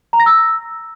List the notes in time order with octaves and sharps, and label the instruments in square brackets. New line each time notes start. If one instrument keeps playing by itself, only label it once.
[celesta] A#5
A#6
E6